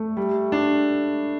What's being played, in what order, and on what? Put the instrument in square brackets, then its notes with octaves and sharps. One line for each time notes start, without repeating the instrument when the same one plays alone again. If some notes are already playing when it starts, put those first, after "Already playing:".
Already playing: [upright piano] A3
[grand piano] G3
D4